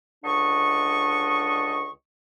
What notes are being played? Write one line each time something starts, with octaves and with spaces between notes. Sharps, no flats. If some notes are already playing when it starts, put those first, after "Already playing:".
C#2 D3 D4 D#5 C#6